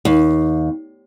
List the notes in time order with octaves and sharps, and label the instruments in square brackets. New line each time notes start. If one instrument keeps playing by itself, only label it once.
[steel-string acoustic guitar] D#2